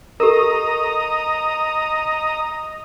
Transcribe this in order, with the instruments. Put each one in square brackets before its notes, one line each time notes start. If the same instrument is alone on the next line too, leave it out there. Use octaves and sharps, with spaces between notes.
[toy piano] G4 A4 A#4 [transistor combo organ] D#5 A#5 D#6